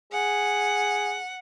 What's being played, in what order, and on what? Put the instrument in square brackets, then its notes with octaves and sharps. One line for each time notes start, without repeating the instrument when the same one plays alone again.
[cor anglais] G#4 [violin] F#5